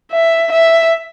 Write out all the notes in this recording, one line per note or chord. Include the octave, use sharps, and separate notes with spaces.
E5
E5